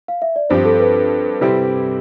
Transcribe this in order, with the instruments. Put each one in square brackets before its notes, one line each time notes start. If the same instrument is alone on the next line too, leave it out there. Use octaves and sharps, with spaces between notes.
[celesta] F5
E5
D5
[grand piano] G2 F3 C4 G4 [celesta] C5
[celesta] A4
B4
[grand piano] C3 G3 C4 E4 G4